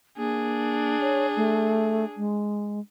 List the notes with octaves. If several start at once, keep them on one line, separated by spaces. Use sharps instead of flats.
A#3 D4 G#4
C#5
A3
G#3